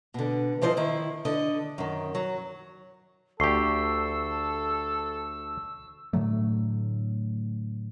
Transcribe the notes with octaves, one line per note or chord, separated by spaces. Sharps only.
B2 D3
E3 F3 C5 D5 D#5
D#3 E4
D3 D#5
F#2 D#3
F#3
D2 G4 A4 C#6 E6 C7
A2 D3 F#3 A3